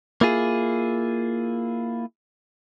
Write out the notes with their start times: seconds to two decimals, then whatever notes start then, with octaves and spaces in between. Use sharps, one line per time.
0.21 A#3 E4 F4 G#4